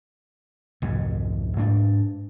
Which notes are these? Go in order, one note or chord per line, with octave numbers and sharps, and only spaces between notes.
C2 F2 G#2
G#2 D4